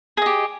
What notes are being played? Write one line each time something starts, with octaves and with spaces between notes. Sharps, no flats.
G4 G#4 D#5